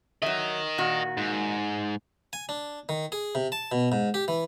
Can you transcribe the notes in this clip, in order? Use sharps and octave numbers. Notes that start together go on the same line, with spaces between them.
F#3 A#4 D#5 E5
A#2 D#3 F#4
G#2
G#5
D4
D#3
G#4
C3
A5
B2
G#2
G4
E3